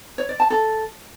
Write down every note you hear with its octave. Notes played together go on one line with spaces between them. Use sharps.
C#5
D5
A5
A4